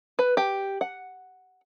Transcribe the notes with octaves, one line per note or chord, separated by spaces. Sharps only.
B4
G4
F#5